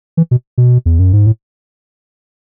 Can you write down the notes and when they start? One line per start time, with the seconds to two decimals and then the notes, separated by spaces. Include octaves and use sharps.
0.17 E3
0.31 B2
0.58 B2
0.86 E2
0.99 F#2
1.13 G#2
1.26 A2